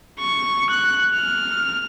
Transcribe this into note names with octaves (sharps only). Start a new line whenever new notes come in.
C#6
F#6
F6